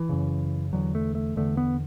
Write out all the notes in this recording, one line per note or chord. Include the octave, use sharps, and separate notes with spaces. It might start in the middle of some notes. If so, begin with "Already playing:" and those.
Already playing: E3
F#2 C#3
E2 D3 F#3
A3
A3
E2 D3 A3
B3